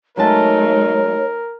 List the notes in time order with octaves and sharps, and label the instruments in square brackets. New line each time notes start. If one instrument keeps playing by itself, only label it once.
[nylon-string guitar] F#3 G#3 A5 [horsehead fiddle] A3 D#4 [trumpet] A#4 [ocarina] C#5